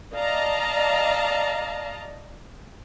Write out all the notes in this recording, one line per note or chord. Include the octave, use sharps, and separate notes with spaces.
D5 D#5 F5 A5 A#5